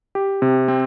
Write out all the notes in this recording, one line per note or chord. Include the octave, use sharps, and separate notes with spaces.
G4
C3
C4